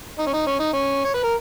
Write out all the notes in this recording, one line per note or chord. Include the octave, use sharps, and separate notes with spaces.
D#4
C#4
D#4
C#4
D#4
C#4
C#5
B4
A#4